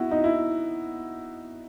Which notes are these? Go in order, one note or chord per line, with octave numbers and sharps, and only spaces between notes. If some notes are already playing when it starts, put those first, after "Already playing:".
Already playing: B3 E4 F#4
D#4
E4